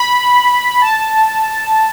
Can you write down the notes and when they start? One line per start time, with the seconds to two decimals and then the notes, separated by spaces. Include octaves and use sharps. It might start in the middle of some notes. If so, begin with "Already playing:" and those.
Already playing: B5
0.82 A5